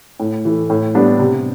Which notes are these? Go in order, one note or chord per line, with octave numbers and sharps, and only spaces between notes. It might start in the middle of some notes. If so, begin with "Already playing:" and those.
A2
E3 A3
A2
G3 B3 D4
C3